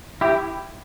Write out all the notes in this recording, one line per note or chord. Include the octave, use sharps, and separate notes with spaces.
E4 G4